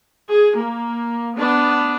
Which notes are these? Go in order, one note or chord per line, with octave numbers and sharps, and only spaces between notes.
G#4
A#3
B3 D4